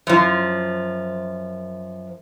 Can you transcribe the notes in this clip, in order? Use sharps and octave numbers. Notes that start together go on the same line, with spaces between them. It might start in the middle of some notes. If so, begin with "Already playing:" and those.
F#2 F3